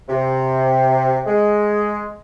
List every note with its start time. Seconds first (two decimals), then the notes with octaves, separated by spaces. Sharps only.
0.08 C3
1.26 G#3